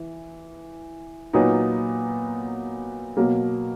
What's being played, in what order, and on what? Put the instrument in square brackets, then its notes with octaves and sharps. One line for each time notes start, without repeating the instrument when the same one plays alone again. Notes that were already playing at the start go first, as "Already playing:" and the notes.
Already playing: [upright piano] E3
A#2 F#3 B3 D#4
B2 F#3 A#3